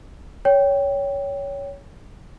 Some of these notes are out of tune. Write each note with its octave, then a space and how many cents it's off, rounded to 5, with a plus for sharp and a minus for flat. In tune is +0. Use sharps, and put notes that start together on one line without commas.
C#5 +15 G5 +0